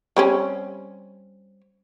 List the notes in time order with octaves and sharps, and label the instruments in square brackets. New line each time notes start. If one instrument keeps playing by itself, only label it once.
[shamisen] G3 C4 C#4